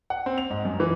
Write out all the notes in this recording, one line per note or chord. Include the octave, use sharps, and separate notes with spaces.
F#5
C4
F7
G#2
F#2
E3